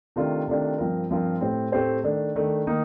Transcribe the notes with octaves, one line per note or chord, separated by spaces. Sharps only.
C3 D#3 A3 D4 F4
C3 D#3 A3 D4 F4
G2 F3 C4 F4 A#4
G2 F3 C4 F4 A#4
A2 A3 C4 G4 C5
A2 A3 C4 G4 C5
D#3 A3 D4
D#3 A3 D4
D#3 A#3 D#4